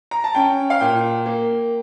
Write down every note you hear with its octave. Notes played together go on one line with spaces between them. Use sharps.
A#5
A5
C#4 G5
F5
A#2 G5
A#3